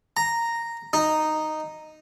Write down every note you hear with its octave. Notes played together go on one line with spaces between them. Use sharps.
A#5
D#4